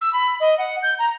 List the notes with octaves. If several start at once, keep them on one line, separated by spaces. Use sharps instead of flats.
E6
B5
D#5
F#5
G6
A#5